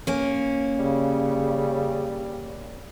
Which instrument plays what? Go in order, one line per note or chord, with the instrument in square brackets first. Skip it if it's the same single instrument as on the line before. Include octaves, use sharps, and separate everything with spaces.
[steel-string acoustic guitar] A#3 C#4
[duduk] C#3 [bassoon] G3